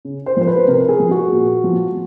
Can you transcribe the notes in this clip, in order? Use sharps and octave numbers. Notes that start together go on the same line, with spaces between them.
C#3
C5
F3 C5
B4
C3 A#4
G#4
F3
F#4
A#2
F3